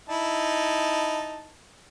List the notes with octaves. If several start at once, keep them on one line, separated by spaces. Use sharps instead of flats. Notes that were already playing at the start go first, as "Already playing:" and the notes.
D#4 E4 A5